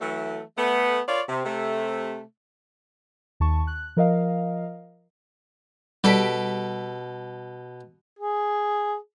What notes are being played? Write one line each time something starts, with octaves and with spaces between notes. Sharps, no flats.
E3 F#3 A3
A3 B3
F4 A#4 C#5 D5 F5
C3
C3 A3
D#2 A5 C#6
F#6
F3 A#4 D#5 F5
B2 G3 A4 B6 D7
G#4